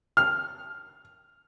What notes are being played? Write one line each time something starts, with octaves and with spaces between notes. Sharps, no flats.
F6